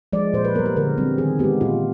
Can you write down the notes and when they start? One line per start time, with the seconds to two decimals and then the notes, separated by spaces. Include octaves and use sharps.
0.13 F3 G#3 D5
0.33 A#2 C5
0.45 B4
0.55 B3 A#4
0.59 G3
0.66 A#4
0.76 D3 A#4
0.98 G3 C4
1.18 D#3 G#4
1.39 G#3 B3 G4
1.61 A#2 F4